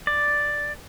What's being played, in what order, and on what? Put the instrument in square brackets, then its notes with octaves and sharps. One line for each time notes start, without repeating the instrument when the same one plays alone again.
[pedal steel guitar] D5